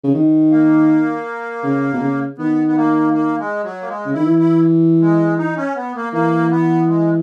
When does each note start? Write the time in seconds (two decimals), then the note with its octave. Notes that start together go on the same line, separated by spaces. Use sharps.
0.04 C#3
0.14 D#3
0.51 A#3
1.63 C#3
1.94 B2
2.01 C#3
2.38 D#3 B3
2.68 B3
2.77 A#3
3.13 A#3
3.39 G#3
3.63 F#3
3.82 A#3
3.88 G#3
4.05 C#3
4.13 D#3 E4
4.26 E3
4.38 E4
5.01 G#3
5.38 D#4
5.57 C#4
5.76 B3
5.95 A#3
6.13 E3 A#3
6.51 B3
6.88 G#3